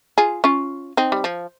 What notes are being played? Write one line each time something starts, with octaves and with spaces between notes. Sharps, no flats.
F4 G#4
C#4 F4
C4 D#4
G3
F3